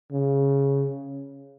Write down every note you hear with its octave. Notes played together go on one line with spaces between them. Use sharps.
C#3